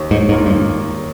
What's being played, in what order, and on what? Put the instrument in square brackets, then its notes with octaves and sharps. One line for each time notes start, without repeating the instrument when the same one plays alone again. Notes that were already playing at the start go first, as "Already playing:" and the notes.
Already playing: [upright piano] D#2
[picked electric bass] G#2
[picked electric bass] G#2 [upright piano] D#3 A#3 F4
[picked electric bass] G2